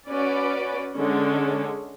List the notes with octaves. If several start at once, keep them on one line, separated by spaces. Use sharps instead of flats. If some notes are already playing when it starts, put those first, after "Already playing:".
C#4 F#4 B4 D5
D3 G#3 C#4